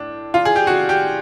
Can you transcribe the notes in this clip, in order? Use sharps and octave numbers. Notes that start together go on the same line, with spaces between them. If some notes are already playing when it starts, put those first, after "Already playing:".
Already playing: A2 D4
F4
G#4
G4
F#4
G4